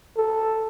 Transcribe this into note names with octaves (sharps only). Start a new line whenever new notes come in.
A4